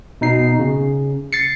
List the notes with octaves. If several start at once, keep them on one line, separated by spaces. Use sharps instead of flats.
B2 D#4 C7
C#3
A6 C7 C#7